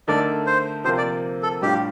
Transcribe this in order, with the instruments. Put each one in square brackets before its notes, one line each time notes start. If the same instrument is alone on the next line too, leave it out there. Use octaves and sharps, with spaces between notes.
[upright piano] D3 A3 D#4 A#4 [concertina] D5
[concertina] C5
[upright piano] C3 F3 A#3 [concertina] C5
[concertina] D5
A4
[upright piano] A2 G3 D4 F4 [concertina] G4